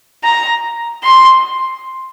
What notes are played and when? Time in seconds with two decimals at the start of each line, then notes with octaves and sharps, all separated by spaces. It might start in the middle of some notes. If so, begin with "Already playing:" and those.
0.24 A#5
1.04 C6